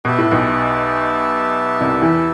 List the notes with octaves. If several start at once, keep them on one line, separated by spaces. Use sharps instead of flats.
B2 G4 B4 E5 A5
A2
B1 B2
C2 C3
E2 E3